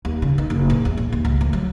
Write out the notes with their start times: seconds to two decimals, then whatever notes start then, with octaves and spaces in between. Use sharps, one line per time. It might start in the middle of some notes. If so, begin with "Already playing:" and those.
0.05 D#2
0.22 C#3
0.38 D#3
0.50 F#1
0.70 A#1
0.85 E2
0.97 A#1
1.12 D#2
1.25 C#2
1.41 D2
1.53 F#3